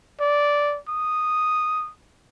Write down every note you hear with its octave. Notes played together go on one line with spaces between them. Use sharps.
D5
D#6